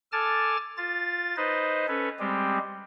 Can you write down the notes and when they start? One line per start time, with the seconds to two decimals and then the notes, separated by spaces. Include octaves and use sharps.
0.12 A4 G#5 A5 D6 F6 A6
0.77 F4 A6
1.37 D#4 B4 C5 D#5
1.88 C#4 A4 B4 C#5
2.20 G3 G#3 C4 G4